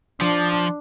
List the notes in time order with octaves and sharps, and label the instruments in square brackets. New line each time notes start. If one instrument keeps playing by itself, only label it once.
[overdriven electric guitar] F3 [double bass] D4